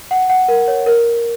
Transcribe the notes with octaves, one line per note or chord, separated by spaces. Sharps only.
F#5
F#5
A#4
C#5
A#4